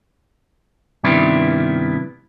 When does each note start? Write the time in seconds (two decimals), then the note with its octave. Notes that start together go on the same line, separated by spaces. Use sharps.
1.04 G2 C3 D#3 B3 D4 E4